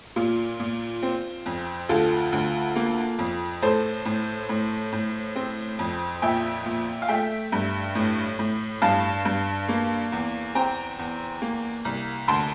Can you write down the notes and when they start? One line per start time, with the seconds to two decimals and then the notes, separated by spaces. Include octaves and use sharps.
0.16 A#2 F4
0.60 A#2
1.03 C4
1.46 F2
1.89 D2 F4 A4
2.32 D2
2.76 A#3
3.19 F2
3.62 A2 A4 C5
4.05 A2
4.49 A2
4.92 A2
5.36 C4
5.79 F2
6.22 A#2 E5 G5
6.66 A#2
7.02 F5
7.08 A3 E5 G5
7.52 G2
7.95 A2
8.39 A2
8.82 G2 F5 A5
9.25 G2
9.69 A#3
10.12 E2
10.55 C4 G5 A#5
10.99 E2
11.42 A#3
11.85 C2
12.28 D2 A5 C6